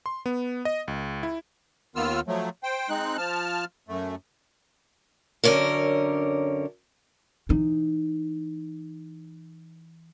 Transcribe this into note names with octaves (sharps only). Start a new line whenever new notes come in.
C6
B3
D#5
C#2
E4
D#2 D#3 B3 F4 E6 F6
F3 F#3 A3
C5 G5
G#3 C4 D#4 F#6
F3 A5 F6
F#2 A3
F#2 D3 C#4 A#4
E3 D#4